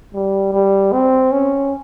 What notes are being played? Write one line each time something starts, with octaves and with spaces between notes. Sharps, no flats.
G3
G3
C4
C#4